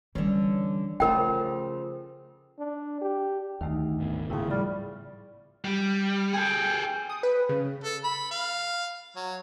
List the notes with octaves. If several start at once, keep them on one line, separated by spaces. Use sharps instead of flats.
D3 E3 G3 C#4
C#3 F3 A3 C#4 A#4 G5
D4
G4
D2 D#3 A3 D#4
F#1 G#2 B3
A2 C#3 F3 E4 F#5
G3 B5 F6 A6
G3
G#4 A4 G5
D#6
B4
C#3
A4
B5
F5
F#3